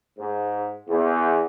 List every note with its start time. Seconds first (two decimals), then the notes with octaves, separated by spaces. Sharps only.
0.16 G#2
0.87 E2